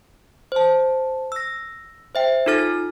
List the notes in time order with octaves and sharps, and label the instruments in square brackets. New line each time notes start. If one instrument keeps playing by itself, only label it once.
[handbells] C5 A5
E6 A#6
C5 E5 G5
D#4 F4 A4 F6 A6